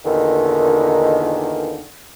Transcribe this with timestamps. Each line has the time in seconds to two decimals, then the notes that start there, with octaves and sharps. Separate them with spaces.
0.05 E2 A#2 D3 D#3